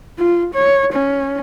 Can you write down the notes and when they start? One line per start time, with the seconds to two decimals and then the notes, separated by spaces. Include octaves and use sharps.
0.18 F4
0.54 C#5
0.93 C#4